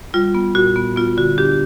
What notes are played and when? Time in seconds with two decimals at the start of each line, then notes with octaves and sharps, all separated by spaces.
0.14 G3 F4
0.34 B3
0.55 A#2 F#4
0.76 B3
0.96 B3 F4
1.17 D3 F#4
1.38 D4 G4